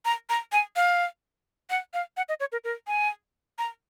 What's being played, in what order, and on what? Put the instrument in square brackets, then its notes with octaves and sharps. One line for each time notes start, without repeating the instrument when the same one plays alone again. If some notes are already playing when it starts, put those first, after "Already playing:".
[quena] A#5
A#5
G#5
F5
F#5
F5
F#5
D#5
C#5
A#4
A#4
G#5
A#5